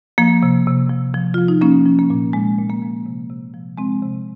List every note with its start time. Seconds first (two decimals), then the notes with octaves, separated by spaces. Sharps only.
0.18 F3 A#3
0.43 C3
0.67 C3
0.89 F3
1.14 F3
1.34 F3 F4
1.48 D#4
1.61 F3 A#3 C#4
1.86 F3
1.99 A#3
2.10 A#2
2.33 A#2 G#3
2.58 A#2
2.70 A#3
2.82 F3
3.06 C3
3.30 C3
3.54 F3
3.78 F3 G#3 C4
4.02 C3